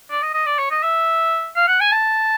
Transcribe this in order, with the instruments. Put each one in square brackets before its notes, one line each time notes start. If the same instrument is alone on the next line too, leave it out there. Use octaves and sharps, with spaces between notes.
[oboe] D5
D#5
D#5
D5
C#5
D#5
E5
F5
F#5
G#5
A5